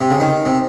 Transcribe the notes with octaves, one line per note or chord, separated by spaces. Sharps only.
C3
C#3
D#3
C3